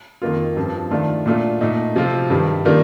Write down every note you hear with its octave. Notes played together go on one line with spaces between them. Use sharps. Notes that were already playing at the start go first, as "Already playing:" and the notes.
F2 D#3 A#3 F4
G2 F3 C4
D#3 A3 D4 F4
A#2 A3 D4 F4
A#2 A3 D#4
C3 F3 C4 F4
G2 D#3 G3
D#3 G3 A#3 D4 F4